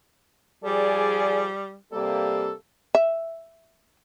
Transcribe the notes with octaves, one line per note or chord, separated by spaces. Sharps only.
F3 G3 G#4 D5
C3 G3 A#3 A4
E5